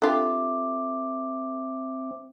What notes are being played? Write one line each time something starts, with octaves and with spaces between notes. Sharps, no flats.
C4 D4 F4 G4 A4 E5 D6